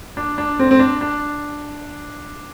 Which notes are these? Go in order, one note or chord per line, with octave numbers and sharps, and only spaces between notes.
D4
D4
C4
C4
D4
D4